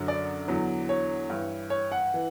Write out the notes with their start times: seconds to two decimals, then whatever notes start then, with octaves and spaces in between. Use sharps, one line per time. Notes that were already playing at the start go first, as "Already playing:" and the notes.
Already playing: F#2 D3 F#3
0.08 D5
0.48 E2 D3 F#3
0.89 C#5
1.30 G2 E3
1.70 C#5
1.92 F#5
2.14 E3